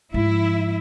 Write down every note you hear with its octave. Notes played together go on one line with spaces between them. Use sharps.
G#2 F3 E4